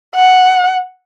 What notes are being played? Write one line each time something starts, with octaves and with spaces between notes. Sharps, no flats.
F#5